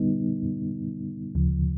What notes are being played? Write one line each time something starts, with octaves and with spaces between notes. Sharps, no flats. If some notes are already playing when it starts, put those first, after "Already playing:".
Already playing: D3 G3 B3 D#4
D2 C#3 F3